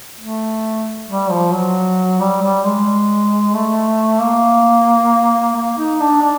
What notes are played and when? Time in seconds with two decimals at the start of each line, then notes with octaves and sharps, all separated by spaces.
0.19 A3
1.08 G3
1.30 F3
1.53 F#3
2.20 G3
2.42 G3
2.65 G#3
3.54 A3
4.21 A#3
5.56 A#3
5.78 D#4
6.00 D4
6.22 D4